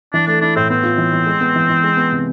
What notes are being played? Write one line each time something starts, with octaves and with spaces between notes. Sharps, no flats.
E3 D4
A3 D4
D4 E4
A2 C4
B3 C4
F4
E3
E3
G#3
B3
E3
E3
G#3
B3
C3